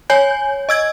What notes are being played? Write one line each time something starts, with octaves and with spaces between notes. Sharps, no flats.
C#5 G#5 G6
D#5 E6 G#6